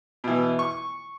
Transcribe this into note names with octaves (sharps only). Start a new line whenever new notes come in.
B2 E3
C#6